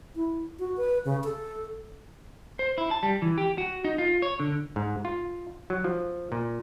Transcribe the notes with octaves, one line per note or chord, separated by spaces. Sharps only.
E4
F#4
B4
C#3
A4
C5
E4
A5
G3
E3
G4
F#4
D#4
F4
C#5
D3
G#2
F4
F#3
F3
A#2